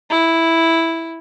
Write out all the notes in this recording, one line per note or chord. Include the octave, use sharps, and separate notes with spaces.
E4